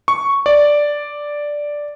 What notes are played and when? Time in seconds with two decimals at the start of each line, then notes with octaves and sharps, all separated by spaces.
0.08 C#6
0.46 D5